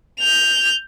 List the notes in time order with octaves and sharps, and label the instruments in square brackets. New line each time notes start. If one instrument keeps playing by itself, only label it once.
[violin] G6 F7